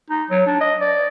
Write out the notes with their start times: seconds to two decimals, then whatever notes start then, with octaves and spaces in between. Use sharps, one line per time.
0.10 D#4
0.30 F#3
0.47 D4
0.61 D#5
0.80 D5